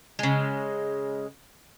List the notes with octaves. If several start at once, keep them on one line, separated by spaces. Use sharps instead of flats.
C#3 G#3